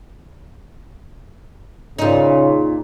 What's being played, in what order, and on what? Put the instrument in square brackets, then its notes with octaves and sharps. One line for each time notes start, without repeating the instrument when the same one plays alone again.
[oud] A#2 D#4 [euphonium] C#3